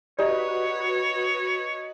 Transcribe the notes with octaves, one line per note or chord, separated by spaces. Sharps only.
D#4 F#4 G4 B4 C#5 D5